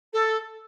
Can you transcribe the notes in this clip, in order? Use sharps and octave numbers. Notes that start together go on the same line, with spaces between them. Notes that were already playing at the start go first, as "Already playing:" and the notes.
A4